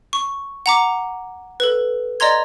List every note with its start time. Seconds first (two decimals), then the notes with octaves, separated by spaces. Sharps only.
0.13 C#6
0.66 F#5 A#5 D6
1.60 A4 B4
2.20 D5 D#5 A#5 C6 G#6